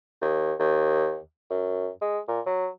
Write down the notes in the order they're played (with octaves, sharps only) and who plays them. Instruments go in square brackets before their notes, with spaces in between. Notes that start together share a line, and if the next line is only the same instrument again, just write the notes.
[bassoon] D#2
D#2
F#2
G#3
A#2
F#3